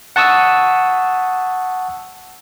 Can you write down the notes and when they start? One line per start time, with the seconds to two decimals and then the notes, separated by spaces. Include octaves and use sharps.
0.16 F#5 A5 C#6 D#6 E6